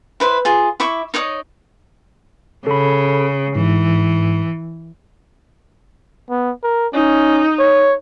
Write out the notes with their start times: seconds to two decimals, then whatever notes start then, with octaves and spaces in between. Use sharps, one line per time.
0.20 E4 B4 C5
0.45 F4 G#4
0.80 E4 E5 C#6 D6
1.14 D#4 C#5 D5 D#6
2.67 C#3 A4 B5
3.55 G#2 E3
6.30 B3
6.63 A#4
6.93 C#4 D#4
7.59 C#5